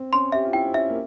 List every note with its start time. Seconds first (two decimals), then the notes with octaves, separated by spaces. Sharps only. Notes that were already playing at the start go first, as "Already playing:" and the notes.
Already playing: C4
0.13 C#4 C6
0.32 G4 E5
0.45 F4
0.53 E4 G5
0.66 C4
0.73 C#4 E5
0.89 A#3